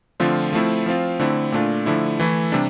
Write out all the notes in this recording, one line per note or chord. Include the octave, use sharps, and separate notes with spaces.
D3 F3 A3 C4 F4
F3 A3 C4 E4
F3 C4 F4
D3 A3 C4 E4
A#2 A3 D4 F4
D3 F3 A3 E4
E3 A3 E4
C3 G3 D4